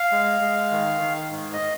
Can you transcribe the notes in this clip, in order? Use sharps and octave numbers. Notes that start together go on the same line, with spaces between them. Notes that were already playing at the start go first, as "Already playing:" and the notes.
Already playing: F5
G#3
G#3
D#3
D#3
G#2
D#5